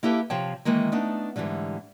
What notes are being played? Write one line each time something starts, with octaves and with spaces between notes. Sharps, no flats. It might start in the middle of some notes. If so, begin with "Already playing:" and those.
A#3 E4 G4 A4 B4
C3 F3 G4 C#5 G5 A5
D#3 E3 G#3 A#3
A3 B3 D4 D#4
G#2 B2 D3 E3 G3